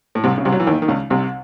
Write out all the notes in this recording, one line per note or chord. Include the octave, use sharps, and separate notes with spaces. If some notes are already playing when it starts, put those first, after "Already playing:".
A2
C2 C3
C#3
C2 C3
F#3
E3
D#2 D#3
D#3
C#2 C#3
C2 C3